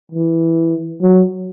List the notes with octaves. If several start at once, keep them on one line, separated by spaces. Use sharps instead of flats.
E3
F#3